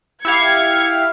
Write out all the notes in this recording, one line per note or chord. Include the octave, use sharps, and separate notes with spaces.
E4 G4 F5 G#6 C#7